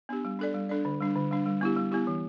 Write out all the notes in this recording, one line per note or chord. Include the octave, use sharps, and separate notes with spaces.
B3 D4 G4
G3
D4 A4 D5
G3
D4 A4 D5
D3
G3 D4
D3
G3 D4
G3
B3 E4 G4
G3
B3 E4 G4
E3